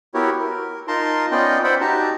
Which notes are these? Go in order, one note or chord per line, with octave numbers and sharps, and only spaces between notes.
B3 E4 F#4 G4 A#4 C#5
A#4
D#4 F4 A#4 A5 A#5 C6
B3 C#4 F4 D5 D#5 G5
C5 D5 E5 F#5 G5 B5
D#4 F#4 G4 A5 A#5